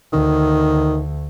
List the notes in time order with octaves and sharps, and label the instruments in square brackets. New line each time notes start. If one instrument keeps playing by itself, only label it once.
[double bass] D2 [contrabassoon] D#3